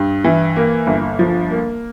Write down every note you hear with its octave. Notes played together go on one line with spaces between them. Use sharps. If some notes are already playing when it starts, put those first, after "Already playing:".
Already playing: G2
E3
A#3
G1
F3
A#3